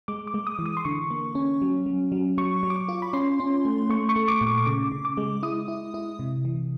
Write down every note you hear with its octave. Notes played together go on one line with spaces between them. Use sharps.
G#3 D6
D6
G#3
D#6
E3
D#6
C6
D3 C#6
A#3
C#4
F#3
F#3
F#3
F#3 C#6
F#3
D6
C#6
F4
B5
C#4 C6
C#4
A3
A3 C#6
C#6
A3
D6
A#2
D6
C#3 D6
C#3
D6
G#3
E4 D#6
E4
E4
C3
E3